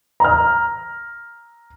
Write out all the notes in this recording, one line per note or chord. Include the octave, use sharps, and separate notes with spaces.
A#5 F6